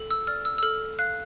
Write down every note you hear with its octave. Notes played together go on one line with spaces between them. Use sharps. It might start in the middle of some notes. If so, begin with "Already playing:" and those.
Already playing: A4
E6
D5 F6
E6
E6
A4 F6
F5 F#6